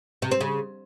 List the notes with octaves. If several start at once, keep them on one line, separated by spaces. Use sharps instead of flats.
C3
C4
C#3